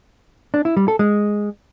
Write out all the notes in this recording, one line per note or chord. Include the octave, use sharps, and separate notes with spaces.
D4
E4
G3
A4
G#3